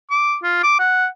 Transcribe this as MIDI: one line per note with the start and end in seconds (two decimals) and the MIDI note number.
0.11 0.36 86
0.43 0.60 65
0.63 0.78 86
0.79 1.07 78